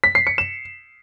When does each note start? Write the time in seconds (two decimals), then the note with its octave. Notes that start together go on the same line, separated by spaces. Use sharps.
0.04 B6
0.15 C7
0.27 C#7
0.38 E7